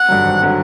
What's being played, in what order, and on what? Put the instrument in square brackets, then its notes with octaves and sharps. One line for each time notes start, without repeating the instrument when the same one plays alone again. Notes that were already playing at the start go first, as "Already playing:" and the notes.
Already playing: [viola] F#5
[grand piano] G2 D3 F#3
G#1
D3 F#3